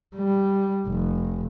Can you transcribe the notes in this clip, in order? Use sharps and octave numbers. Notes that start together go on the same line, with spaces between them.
G3
F1